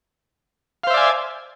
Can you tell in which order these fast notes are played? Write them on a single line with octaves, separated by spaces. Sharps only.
F5 C5 E5 D5 G#5